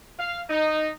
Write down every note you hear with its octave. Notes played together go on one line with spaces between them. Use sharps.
F5
D#4